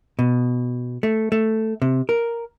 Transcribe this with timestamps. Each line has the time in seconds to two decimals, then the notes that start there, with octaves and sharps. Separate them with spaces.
0.19 B2
1.03 A3
1.32 A3
1.82 C3
2.09 A#4